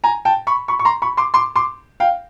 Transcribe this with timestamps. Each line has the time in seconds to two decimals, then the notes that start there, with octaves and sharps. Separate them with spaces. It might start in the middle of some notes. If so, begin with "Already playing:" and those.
0.04 G#5 A#5
0.25 G5 A5
0.47 B5 C#6
0.68 B5 C#6
0.79 C#6
0.85 A#5 C6
1.02 B5 C#6
1.17 C6 D6
1.34 C6 D6
1.56 C6 D6
2.00 F5 G5